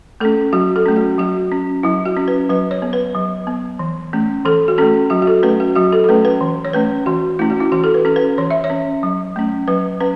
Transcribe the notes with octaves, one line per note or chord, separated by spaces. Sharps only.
A3 C#4 A4
F#3 F#4
A4
A3 C#4
F#4
F#3 F#4
C#4
F#3 E4
F#4
C#4
B4
F#3 B4
C#5
B3
B4
F#3
B3
E3
A3 C#4
E3 A4
F#4
A3 C#4 A4
F#3 F#4
F#4
A4
A3 C#4 B4
F#4
F#3 F#4
A4
A4
A3 C#4 B4
B4
E3
C#5
A3 C#4 B4
E3 F#4
A3 C#4 E4
F#4
E4
E3 F#4
A4
B4
C#4 A4
B4
E3 C#5
E5
C#5
C#4
F#3
A3 C#4
F#3 B4
C#4 B4